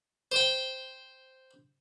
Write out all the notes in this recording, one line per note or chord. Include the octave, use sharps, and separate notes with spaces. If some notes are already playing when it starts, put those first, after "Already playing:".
C5 G5